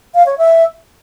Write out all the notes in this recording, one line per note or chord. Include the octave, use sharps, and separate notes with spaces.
F5
C#5
E5